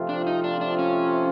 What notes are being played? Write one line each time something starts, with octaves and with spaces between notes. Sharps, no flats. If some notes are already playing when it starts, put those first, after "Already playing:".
Already playing: C3 F3 A3 C4 F4
D4
D#4
D4
D4
C#4